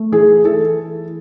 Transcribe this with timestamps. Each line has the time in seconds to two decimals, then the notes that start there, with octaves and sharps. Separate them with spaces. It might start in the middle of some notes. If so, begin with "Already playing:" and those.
Already playing: A3
0.12 E3 G#4
0.45 E3 A4